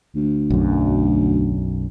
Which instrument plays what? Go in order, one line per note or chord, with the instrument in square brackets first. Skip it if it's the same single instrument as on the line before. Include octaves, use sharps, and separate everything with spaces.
[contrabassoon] D2
[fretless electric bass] B1 F#2